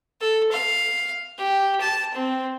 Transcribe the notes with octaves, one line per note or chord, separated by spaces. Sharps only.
A4
F5
G4
A5
C4